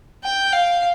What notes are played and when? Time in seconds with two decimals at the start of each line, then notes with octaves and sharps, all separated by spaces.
0.24 G5
0.53 F5